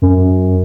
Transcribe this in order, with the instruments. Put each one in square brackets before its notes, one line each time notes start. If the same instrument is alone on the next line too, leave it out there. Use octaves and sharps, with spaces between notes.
[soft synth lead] F#2